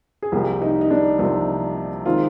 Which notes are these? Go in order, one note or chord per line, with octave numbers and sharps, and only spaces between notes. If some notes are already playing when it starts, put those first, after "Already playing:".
G#4
C2 C3 F3 A#3 G4
D#4
D#4
D4
C2 C3 F3 A#3 D#4
D#3 G#3 C4 F4